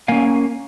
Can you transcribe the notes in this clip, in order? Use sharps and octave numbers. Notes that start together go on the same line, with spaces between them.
A#3 C#4 F5 G#5